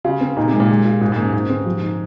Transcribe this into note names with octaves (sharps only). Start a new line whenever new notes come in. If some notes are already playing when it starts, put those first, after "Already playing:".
C#3 F4
C4
A#2 D#4
C3
G#3
A#2
G#3
F4
G#2 F4
G#2
A#3
F#2
G#2 D#4
C4
F3
D#4